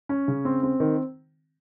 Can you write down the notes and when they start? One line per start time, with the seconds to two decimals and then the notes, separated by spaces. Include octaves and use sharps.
0.09 C#4
0.28 C#3
0.45 C4
0.63 C4
0.80 D#3